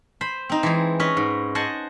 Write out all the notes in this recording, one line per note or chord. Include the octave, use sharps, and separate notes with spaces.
C5 B5
C4 D#4
E3 G#3 G#4
C#4 B4 D#5
G#2
C5 D#5 F#5 G#5 A5